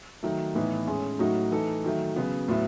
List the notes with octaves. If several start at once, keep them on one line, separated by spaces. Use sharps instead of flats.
D#3 F#3 A3
A2 E3 B3 D#4
A2 G#3 C#4 G#4
A2 F#3 A3 D#4 F#4
E3 A3 D#4 A4
D#3 F#3 A3
C#3 F#3 B3
A2 F#3 B3 E4